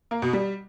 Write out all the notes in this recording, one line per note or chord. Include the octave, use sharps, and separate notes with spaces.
A#3
B2
G3